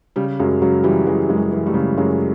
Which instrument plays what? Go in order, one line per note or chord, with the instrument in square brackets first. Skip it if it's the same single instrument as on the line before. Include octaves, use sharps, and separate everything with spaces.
[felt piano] C#3 G3
F#2 F#3 G#3
C#3 F#3
E3 G3
E3 F#3 G#3
F#2 G#3
G3
E3
G3 A3
C#3
F#2 F#3 G#3